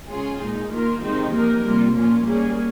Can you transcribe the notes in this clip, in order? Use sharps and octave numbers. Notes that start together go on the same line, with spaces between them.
C#3 G#3 C#4 F4 G#4
A#2 G#3 D#4
D#3 A#3 F4 A#4
C3 D#3 G#3 C4 D#4
F3 A#3 D#4 A#4
C3 G3 A#3 F4
A#2 F3 A#3 C#4 F4
G3 A#3 C#4 G#4